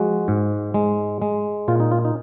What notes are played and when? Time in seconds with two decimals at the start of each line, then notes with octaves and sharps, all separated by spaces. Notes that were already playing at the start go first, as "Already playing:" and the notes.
Already playing: F3 G#3 F#4
0.28 G#2
0.74 G#3
1.22 G#3
1.68 A#2 F4
1.80 D#4
1.91 F4
2.05 D#4